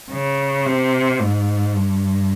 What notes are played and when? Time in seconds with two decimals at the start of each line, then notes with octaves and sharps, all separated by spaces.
0.11 C#3
0.66 C3
1.21 G#2
1.76 G2